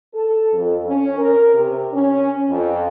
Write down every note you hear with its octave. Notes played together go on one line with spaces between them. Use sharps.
A4
F2
C#4
A#4
C3
C#4
F2